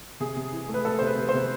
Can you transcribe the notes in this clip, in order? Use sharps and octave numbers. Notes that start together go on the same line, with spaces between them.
C3 G#4
C3
E3
A3
B4
A3 A4
C3 C5
B4
C3
C5
C3